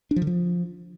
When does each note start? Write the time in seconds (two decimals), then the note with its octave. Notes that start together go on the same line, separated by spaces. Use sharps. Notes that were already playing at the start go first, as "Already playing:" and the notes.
0.11 D4
0.16 F3
0.22 D3
0.27 F3